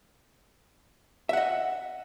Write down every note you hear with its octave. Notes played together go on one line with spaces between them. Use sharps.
D#5 E5 F#5